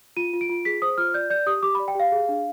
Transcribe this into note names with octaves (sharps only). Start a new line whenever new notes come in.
F4 D#7
F4
D7
F4
G#4 B6
C5 D#6
F4 F6
D5 G6
D5 G6
G4 D#6
G4 D6
D5 B5
G5
G4 F5
G#4
D4